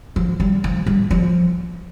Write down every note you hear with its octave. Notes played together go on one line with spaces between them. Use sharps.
F3
G3
F3
G3
F3